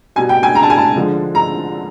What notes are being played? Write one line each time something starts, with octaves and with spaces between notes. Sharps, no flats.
B2 G3 G#5
G5
G#5
A#5
A5
G#5
A5
D3 F3 G#3
A#5